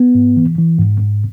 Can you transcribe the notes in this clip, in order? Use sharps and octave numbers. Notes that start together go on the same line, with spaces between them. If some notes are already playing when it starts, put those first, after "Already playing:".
Already playing: B3
G#2
E3
E3
G#2
G#2